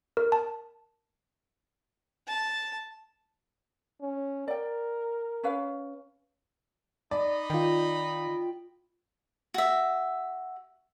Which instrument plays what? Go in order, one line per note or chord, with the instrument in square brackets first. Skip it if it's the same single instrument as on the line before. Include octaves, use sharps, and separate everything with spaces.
[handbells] A#4
A5
[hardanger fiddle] A5
[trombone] C#4
[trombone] A#4 [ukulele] D5 G5
[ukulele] C#4 B4 F5
[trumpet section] D#4 D#5 B5 [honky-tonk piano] D5
[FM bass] D#3 [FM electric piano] F4 G5
[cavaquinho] F#4 E5